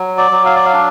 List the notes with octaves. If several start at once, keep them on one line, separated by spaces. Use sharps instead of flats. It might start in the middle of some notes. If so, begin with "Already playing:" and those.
Already playing: F#3
D5
F#3
F5
D5
F5
D4